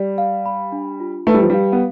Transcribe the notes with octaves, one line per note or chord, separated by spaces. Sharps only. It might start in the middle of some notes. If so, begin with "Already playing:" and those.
Already playing: G3 D5
F5
B5
D4
F4
A3 B4
G3
F3
G3 F5
B3